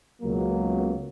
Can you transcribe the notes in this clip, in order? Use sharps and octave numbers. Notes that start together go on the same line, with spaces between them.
C#2 B2 F#3 A#3